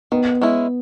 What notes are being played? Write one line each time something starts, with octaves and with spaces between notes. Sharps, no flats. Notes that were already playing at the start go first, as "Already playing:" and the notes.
D#3 B3
G#3 C#4 E4